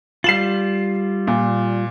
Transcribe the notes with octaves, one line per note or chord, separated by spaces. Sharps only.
G3 F4 C7 E7 F#7
A#2